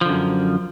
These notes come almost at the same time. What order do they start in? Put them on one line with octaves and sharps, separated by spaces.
F3 D3 F#2